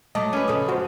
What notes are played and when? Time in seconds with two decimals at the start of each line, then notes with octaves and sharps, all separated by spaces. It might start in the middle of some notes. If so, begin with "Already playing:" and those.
0.15 F#3 A3 D#5 A5 D6
0.33 C#4 B4
0.48 F2 C#3 A4 D#6
0.68 G#2 F#4 C5